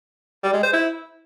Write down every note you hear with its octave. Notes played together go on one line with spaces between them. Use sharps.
G3
G#3
C5
E4